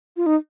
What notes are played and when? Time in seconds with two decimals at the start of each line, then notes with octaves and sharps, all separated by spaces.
0.17 F4
0.26 D#4